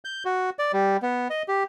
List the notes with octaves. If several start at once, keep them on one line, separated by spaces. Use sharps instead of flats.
G6
F#4
D5
G3
B3
D#5
G4